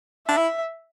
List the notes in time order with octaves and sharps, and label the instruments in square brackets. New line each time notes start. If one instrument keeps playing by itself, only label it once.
[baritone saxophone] D4 [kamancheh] E5
[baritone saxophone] E4